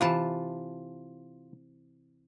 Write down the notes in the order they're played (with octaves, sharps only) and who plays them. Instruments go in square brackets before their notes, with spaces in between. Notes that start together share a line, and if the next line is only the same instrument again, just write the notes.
[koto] C3 E3 A5 [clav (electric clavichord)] F4